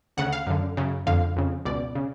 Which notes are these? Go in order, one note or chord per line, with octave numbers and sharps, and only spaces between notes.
D2 C#3 F#5
F5
F#2 D3
F#2 C#3
F2 D3 F5
F2 C#3
C#2 B2 D5
C#3